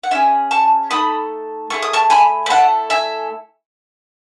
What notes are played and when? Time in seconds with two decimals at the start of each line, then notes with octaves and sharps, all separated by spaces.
0.03 F#5
0.11 C#4 E4 G#4 E5 G#5
0.51 A5 C#6
0.91 A3 D#4 A4 B5 D#6
1.70 A3 E4 G#4 C#6
1.82 D#6
1.93 A5 C#6
2.10 G#5 B5
2.46 B5
2.50 A3 E4 A4 F#5 A5
2.90 E5 G#5